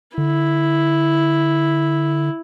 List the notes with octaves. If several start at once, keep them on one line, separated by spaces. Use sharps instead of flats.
D3 E4